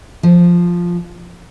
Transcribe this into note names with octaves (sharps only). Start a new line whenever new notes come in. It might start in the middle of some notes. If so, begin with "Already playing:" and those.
F3